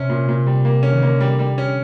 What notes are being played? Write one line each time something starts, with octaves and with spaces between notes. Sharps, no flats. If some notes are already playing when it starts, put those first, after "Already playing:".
Already playing: C3 C#4
A#2
A#2
G3
A#3
C#4
D#3
D3 A#3
G3
G3
C#4